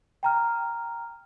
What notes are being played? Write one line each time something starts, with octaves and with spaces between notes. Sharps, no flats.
G5 A#5 F6